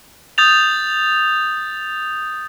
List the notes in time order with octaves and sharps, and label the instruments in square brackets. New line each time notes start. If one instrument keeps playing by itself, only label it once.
[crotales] D#6 G6 A6 F7